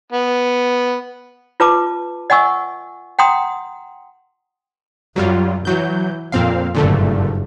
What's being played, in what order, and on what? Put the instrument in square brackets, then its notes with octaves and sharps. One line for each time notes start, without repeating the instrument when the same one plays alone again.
[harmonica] B3
[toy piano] F4 B4 A5 D6
D#5 F#5 G#5 C#6 E6
F#5 G5 A#5 C6 D#6
[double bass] F#2 [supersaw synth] F#3 G3 F4
[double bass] E3 [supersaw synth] F#3 G6
[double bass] F2 [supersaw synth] A#2 C4 F5
[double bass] F#1 G2 [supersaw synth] A#2 D3 A3